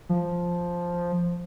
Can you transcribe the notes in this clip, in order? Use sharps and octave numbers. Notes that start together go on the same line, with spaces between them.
F3